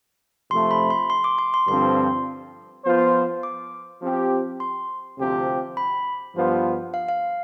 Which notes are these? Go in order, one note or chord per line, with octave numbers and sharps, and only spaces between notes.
C3 F3 A3 C6
B5
C6
C6
D6
C6
C6
G2 D3 F3 C4 C6
F3 B3 F4 C5
D6
F3 C4 G4
C6
D2 C3 F3 C4 G4
B5
G2 F3 B3 F4 C5
F5
F5